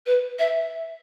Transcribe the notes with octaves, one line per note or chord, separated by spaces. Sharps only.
B4
E5